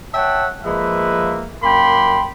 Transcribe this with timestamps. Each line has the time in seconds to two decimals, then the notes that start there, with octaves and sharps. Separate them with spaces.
0.14 C#5 E5 F#5 G5 A5
0.64 F3 G#3 A#3 B4 E5
1.62 F#2 A#3 G5 B5 C6